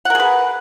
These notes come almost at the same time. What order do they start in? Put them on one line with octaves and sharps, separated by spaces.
F#5 A#4 G#4 B4